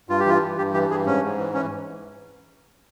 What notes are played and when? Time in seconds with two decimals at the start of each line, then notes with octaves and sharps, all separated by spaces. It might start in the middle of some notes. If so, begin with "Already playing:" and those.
0.09 G2 F4
0.20 G4
0.26 E3 F4
0.42 G2
0.58 G2 G4
0.74 E3 G4
0.89 G2 G#4
1.06 G#2 C#4
1.22 G#2
1.38 E3
1.54 E3 C#4